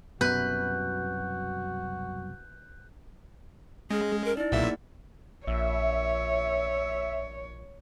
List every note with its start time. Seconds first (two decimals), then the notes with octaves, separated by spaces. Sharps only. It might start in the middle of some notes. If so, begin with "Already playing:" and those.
0.21 C2 F#2 B2 F#4 B4 F#6 G6
3.90 G#3 C#4 G#4 F6
4.25 A#4
4.37 D#4 E4 D5
4.52 B1 A#2 A#3 G#4 E5 F#5
5.47 A#1 C#5 E5